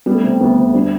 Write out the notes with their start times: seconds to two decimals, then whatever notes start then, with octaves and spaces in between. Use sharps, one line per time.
0.06 G3 B3
0.14 A3
0.23 C3 B3
0.32 C4
0.40 D2 B3
0.58 D2
0.74 G3 D4